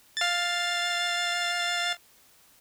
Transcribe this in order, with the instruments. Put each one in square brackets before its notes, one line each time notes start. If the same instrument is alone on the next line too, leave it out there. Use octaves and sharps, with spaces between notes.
[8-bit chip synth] F5 A6